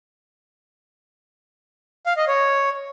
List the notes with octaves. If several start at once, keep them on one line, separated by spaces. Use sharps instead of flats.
F5
D#5
C#5